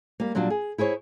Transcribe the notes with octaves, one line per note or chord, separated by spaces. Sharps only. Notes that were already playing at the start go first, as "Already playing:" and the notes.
G3 A#3
A#2 F#3 G3 D4
G#4
E4 G#4 C5 C#5